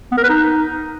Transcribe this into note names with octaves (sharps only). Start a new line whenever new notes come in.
B3
A#4
B4
D#4